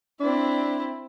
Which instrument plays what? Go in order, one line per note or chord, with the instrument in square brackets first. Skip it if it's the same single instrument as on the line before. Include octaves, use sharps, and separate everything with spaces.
[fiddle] C4 E4 [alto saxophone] D4